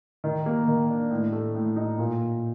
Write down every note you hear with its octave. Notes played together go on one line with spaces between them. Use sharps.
D#3
A#3
D#3
D4
A2
A3
A2
D#4
A#2